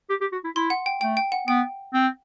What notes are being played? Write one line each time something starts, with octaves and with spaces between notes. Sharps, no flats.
G4
G4
F#4
E4
E4 C6
F#5
G5
A3 G5
G5
F#5
B3 G5
C4